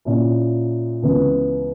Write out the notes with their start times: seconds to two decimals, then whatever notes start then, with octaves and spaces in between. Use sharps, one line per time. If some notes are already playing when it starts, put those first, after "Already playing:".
0.05 A#2 A#3 C#4 E4
1.02 C#2 C#3 E3 B3